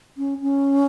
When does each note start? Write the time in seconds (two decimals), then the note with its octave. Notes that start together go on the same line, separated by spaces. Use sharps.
0.18 C#4
0.42 C#4